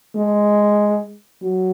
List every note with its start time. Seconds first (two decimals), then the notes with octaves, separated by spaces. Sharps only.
0.15 G#3
1.43 F#3